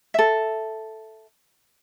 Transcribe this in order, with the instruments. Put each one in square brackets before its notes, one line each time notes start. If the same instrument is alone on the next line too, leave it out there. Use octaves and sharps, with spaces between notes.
[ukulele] A4 E5